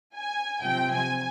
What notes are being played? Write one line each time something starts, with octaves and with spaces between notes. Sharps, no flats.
G#5
C3 F3 C4 G5
G#5